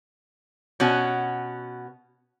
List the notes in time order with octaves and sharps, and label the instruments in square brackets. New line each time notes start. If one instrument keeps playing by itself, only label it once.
[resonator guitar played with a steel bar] B2 C#4 F#4